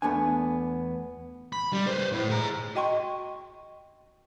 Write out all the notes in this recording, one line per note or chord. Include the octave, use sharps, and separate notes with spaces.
E2 A3 B3 D4 G#5
B5
G3
B4 C5
A2
G#4 A#5
F#4 D#5 G5 C6 C#6